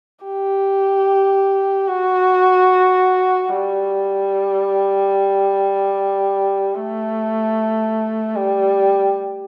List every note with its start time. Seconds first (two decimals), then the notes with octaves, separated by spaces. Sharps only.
0.25 G4
1.87 F#4
3.49 G3
6.75 A3
8.36 G3